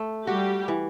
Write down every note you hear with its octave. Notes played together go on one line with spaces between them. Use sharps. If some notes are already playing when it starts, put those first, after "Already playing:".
Already playing: A3
G3 F#4 G4
E3